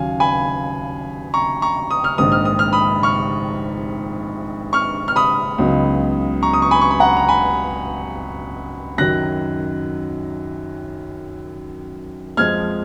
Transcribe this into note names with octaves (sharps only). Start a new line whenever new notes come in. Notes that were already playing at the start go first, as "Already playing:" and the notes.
Already playing: D#2 C#3 F#3 C#4 F5 G#5
G#5 B5
A#5 C#6
A#5 C#6
D#6
F6
A#1 G#2 D#3 D#6
F6
D#6
F6
B5 D#6
C#6 F6
C#6 F6
F6
B5 D#6
C#2 C#3 F#3 B3 D#4
A#5 C#6
D#6
C#6
G#5 B5
C#6
B5
F#5 A#5
A#5
G#5 B5
F#2 D#3 F#3 F#6 A#6
F2 F3 G#3 F6 G#6